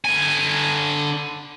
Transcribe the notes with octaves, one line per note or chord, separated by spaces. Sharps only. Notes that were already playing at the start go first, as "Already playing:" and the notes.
D3 G#5